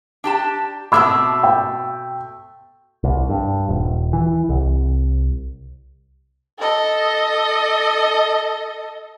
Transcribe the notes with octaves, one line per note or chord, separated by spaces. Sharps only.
D4 G4 A5
B2 A3 C4 D6 E6
G5
C2
G2
D#1
E3
C2
A4 D#5